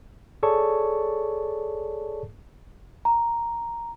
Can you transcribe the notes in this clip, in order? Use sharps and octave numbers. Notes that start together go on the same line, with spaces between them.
G#4 A4 C#5 D5 A5 C#6
A#5